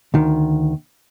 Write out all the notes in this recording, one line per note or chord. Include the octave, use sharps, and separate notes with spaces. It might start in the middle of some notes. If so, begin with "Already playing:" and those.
D2 D#3